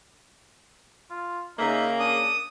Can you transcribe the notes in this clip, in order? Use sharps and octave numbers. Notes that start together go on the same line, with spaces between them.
F4
C#3 A#3 D#4 E5
D4 D#6